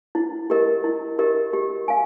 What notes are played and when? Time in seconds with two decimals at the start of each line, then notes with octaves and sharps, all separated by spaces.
0.15 E4
0.50 G4 A#4 D#5
0.84 E4
1.19 G4 A#4 D#5
1.53 G4
1.88 F5 G#5